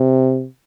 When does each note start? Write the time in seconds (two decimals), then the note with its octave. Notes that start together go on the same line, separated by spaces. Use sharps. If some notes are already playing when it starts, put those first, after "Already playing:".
Already playing: C3